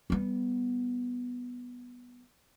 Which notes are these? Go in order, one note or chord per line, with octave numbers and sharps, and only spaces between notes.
G3 B3